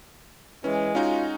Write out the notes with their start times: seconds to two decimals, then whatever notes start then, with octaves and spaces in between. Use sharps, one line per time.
0.64 E3 G#3 C#4
0.95 C#4 D#4 F4 F#4